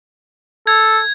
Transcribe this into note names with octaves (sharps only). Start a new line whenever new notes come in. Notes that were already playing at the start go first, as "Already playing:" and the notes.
A4 G#6